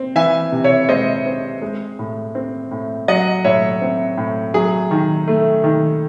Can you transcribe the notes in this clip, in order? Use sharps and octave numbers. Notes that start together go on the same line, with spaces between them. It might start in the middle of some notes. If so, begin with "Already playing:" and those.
Already playing: C4
E3 E5 G#5
C3
C#5 E5
G#3 C5 D#5
C4
G#3
A2
C4
A2
F#3 D#5 F#5
A2 C#5 E5
C4
A2
F#3 G#4
D#3
A3
D#3